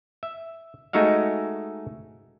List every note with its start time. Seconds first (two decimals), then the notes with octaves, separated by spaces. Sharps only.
0.23 E5
0.93 G#3 A3 D#4 F#4 E5 F5